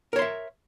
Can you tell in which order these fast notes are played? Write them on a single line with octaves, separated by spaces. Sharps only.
A#4 C#5 C6 E5